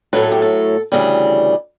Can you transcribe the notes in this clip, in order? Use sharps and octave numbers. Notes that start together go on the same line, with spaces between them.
A2 F#3 A3 B4
A4
G4
A4
D2 C#3 E3 G3